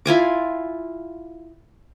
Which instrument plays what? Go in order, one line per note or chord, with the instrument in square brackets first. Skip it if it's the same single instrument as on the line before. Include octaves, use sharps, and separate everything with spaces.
[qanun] E4 F4 G#5 D6